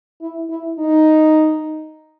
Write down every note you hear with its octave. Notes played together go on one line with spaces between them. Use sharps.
E4
E4
D#4